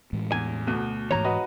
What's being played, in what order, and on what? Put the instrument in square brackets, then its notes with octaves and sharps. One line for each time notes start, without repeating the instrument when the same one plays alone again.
[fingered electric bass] A2 E3 G#3
[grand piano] E2 [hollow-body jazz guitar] G#5
[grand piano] D2 B2
[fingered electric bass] G#2 E3 [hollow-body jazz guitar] C#5 A#5
[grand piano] F#4 B4 D#5